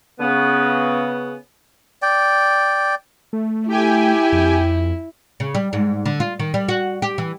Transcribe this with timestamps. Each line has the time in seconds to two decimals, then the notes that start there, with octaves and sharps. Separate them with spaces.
0.20 C#3 B3
2.02 D5 G5
3.33 A3
3.68 E4 G4 G5 G#5
4.32 F2
5.40 C#3
5.55 G3
5.73 G#2
6.06 D3
6.20 F4
6.40 D#3
6.54 G3
6.69 F#4
7.02 G4
7.18 E3